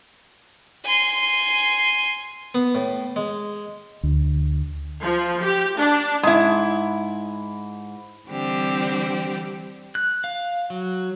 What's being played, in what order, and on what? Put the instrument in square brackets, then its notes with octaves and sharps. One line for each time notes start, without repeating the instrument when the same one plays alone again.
[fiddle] G#5 C6
[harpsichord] B3
A2
G#3
[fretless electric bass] D2
[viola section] F3
G4
D4
[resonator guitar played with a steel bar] G#2 E4
[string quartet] D3 E3 G3 C4 D4 G4
[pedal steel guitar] F#6
F5
F#3